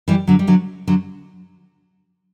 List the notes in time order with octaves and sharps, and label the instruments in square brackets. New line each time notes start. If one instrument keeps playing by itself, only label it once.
[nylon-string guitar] E3 G3
D3 F#3
G3
D3 F#3
D3 F#3